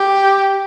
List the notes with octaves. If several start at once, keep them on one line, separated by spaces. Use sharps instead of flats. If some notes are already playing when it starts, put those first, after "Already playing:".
Already playing: G4